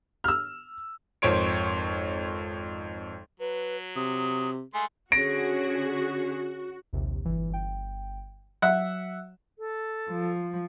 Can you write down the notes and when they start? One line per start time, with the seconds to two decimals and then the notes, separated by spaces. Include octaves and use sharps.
0.24 E6 F6
1.22 G#1 F2 C5 C#5 D7
3.40 F#3 B4
3.96 C3 D#6
4.74 G#3 A3 G#5 C6
5.12 D3 C#4 F#4 G#4 A#6 D7
6.93 A#1 D#2 C3
7.25 G1 E3
7.50 G1 G5
8.62 F#3 E5 F#5
9.58 A4
10.09 F3